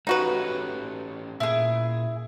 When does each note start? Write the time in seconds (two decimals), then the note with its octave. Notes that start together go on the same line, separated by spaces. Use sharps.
0.07 A3 C#4 D#4 F#4 G4 B4
1.40 A#2 E4 G#4